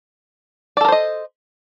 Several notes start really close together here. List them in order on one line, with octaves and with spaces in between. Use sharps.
D5 A4 A#4 C5 D#5